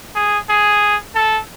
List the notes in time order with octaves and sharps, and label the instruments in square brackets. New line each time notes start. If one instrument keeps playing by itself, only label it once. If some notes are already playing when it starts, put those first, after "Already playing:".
[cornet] G#4
G#4
A4